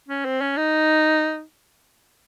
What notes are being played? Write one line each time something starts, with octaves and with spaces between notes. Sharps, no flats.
C#4
C4
C#4
D#4